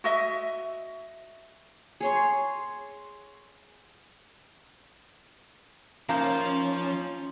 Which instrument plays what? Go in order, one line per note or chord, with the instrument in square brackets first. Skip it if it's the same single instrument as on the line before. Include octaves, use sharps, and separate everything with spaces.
[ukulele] F#4 D#5 E5
[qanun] G#4 C#5 C6
[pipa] D#3 A#3 [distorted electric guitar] F3 C5 [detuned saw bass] C#4